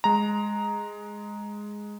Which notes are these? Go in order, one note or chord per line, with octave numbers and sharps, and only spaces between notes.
G#3 A#5